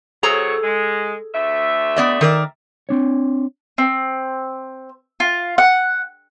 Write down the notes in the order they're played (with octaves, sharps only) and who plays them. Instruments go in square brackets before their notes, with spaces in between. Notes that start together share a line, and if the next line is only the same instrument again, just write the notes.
[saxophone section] C3 F#3 C#5 [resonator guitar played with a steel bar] G#4 A4 A#5
[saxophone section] G#3
D2 A3 E5
[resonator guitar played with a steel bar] B3 D5 D#5
D#3 A#4 D5
[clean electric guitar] C4 D4 C#5
[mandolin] C4
F4
F#5